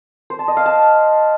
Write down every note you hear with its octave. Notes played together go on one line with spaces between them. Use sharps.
C5
A5
D#5
F5
A5